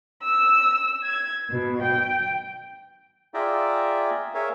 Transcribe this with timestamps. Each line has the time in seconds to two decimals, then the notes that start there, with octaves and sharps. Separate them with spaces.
0.23 E6
1.02 G#6
1.52 B2
1.83 G5
3.34 F4 G#4 D5 E5 G5 A#5
4.34 G#4 A#4 C#5 E5 F5